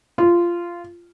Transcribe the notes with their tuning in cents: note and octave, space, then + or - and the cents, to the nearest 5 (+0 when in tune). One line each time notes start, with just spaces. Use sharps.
F4 -15